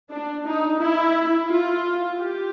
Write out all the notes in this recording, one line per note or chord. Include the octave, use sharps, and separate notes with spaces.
D4
D#4
E4
F4
G4